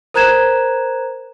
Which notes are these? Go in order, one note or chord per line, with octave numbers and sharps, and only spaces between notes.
A#4 C5 A#5 F#6 G#6 E7